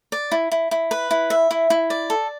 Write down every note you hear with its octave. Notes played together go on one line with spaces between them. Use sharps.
D5
E4
E4
E4
B4
E4
E5
E4
E4
D5
A4